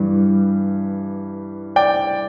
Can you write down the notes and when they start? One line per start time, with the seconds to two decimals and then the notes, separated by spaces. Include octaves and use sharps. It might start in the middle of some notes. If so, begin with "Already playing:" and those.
Already playing: G2 E3 G3
1.76 D5 G5